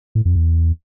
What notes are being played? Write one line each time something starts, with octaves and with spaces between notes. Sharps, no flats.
A2
F2
E2